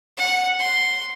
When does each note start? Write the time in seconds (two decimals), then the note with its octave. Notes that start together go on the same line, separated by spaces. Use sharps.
0.17 F#5
0.59 C6